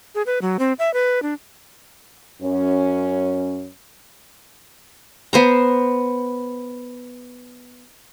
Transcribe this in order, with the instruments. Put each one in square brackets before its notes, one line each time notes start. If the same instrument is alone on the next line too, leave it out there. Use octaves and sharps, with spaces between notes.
[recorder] G#4
B4
F#3
C4
E5
B4
D4
[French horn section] F#2 C#4
[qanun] B3 C5 A#5